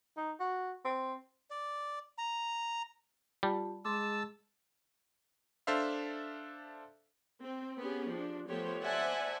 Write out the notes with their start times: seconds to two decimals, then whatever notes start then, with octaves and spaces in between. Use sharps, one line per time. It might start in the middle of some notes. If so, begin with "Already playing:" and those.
0.17 D#4
0.40 F#4
0.85 C4
1.50 D5
2.18 A#5
3.43 G3 F4 G4 A5
3.85 G#3 A5 C6 D6 E6
5.67 D4 A4 C5 E5 F5
7.40 C4
7.78 B3 C#4 G4 G#4
8.10 F3 D4
8.48 F3 A3 B3 G4 C5 C#5
8.82 C5 D5 E5 F#5 G#5 A5